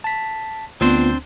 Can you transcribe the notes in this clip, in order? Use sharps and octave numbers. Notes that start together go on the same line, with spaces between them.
A5 B6
D2 B3 C4 D4 F4 C5